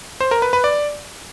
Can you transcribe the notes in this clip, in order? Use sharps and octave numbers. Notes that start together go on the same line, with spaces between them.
C5
A#4
B4
B4
D5